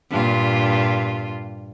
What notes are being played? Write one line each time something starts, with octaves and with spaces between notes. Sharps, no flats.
G2 A#2 F4